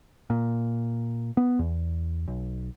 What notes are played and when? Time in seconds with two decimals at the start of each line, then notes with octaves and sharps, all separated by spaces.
0.30 A#2
1.37 B3
1.59 E2
2.28 B1